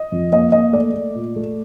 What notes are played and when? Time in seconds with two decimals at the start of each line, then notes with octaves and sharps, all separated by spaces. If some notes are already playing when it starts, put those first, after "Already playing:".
Already playing: D#5
0.12 F2
0.32 A#3 D#5
0.52 A#3 D#5
0.73 A3 D5
0.94 A3
1.15 A#2
1.36 A3